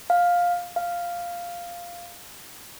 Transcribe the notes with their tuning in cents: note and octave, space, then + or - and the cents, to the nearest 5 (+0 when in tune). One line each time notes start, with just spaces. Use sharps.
F5 +10
F5 -5